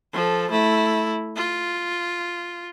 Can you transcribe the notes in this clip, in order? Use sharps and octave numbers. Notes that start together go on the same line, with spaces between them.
F3 A4
A3 E4
F4